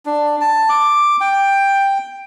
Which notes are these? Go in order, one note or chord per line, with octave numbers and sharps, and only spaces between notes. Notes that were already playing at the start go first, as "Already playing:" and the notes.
D4
A5
D6
G5